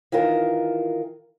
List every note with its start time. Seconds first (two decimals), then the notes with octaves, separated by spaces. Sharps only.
0.12 D#3 E3 F4 A#4